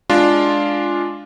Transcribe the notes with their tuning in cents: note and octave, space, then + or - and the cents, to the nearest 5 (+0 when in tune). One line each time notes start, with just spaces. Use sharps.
G#3 +5 D4 +0 F4 +0